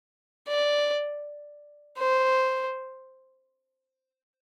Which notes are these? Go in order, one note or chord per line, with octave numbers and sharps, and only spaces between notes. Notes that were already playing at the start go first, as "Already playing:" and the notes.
D5
C5